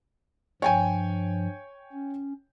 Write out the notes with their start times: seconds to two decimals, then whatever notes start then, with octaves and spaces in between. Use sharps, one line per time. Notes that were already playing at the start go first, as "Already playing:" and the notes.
0.62 G2 F3 C#5 G5 G#5
1.93 C#4